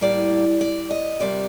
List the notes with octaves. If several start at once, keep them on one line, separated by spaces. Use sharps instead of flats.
A2 G3 A#3 D5
D5
D#5
F2 C3 G3 A#3 D5